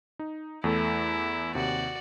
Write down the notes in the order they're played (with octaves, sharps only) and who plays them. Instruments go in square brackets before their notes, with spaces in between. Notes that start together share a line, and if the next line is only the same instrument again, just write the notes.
[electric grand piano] D#4
[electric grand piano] E2 A3 A4 [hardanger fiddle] E4
[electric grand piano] D#2 C3 [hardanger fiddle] F#4 D5